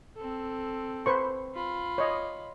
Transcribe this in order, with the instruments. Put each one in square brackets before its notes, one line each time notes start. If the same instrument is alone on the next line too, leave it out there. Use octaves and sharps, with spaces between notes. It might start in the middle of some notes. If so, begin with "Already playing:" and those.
[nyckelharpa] C4 A4
[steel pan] B4 C5 C#6
[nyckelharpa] F4 B5
[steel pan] C#5 D#5